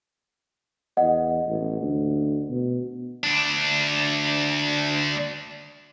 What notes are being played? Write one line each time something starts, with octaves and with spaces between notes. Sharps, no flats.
E2 D#5 F#5
A1
D2
B2
D2 D4